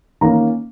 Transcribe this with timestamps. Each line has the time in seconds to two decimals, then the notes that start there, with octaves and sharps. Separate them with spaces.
0.21 D#3 A#3 C#4 A#5